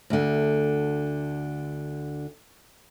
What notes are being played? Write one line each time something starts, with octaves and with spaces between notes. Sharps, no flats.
D2 D3